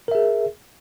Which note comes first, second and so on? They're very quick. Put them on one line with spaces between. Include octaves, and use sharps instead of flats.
A#4 E5 G#4